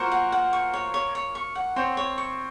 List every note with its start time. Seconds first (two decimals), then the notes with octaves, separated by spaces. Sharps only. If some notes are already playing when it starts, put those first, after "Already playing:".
Already playing: A#3 F4 F#4 A#4 C5 C#6
0.12 F#5
0.32 F#5
0.53 C#6
0.74 C#5
0.94 C#5
1.15 C#5
1.35 C#6
1.55 F#5
1.76 C4 C5 C#5
1.97 C#5
2.18 C#6